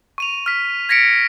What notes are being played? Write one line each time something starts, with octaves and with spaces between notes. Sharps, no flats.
C#6 D#7 F7
F6 B6
G#6 A#6 B6 C#7 D7